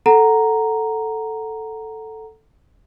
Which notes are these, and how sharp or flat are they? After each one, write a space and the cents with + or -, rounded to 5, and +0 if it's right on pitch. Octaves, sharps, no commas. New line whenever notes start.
A4 +0 F#5 +5 A#5 +0